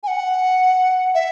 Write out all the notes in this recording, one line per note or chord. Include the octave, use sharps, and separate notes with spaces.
G#5
F#5
E5